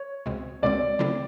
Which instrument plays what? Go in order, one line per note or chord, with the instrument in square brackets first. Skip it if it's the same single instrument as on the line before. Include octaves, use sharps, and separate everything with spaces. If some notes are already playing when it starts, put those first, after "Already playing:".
Already playing: [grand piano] C#5
[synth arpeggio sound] C#2 B2 G#3 C4
[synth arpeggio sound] C#2 B2 G#3 C4 [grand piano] D5
[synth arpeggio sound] C#3 F#3 A3 C4 E4